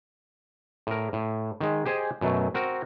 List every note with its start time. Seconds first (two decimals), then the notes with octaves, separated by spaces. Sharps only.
0.87 A2 A#4
1.13 A2
1.60 D#3 G#3
1.85 G4 G#4 C5 D#5 G#5
2.21 F#2 B2 F#3 A3
2.54 C4 F#4 A#4